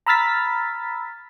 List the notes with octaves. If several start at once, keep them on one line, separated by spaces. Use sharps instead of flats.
A#5 B5 E6 F6 A6 B6